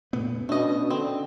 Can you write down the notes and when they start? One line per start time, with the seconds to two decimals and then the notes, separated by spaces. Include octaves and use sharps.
0.13 F2 A#2 A3 B3
0.49 B2 A3 C#4 D4 D#5
0.90 D3 C4